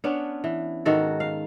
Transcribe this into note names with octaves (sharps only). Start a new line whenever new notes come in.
B3 C#4 D4
E3
G#2 D#3 F#4 A4
F5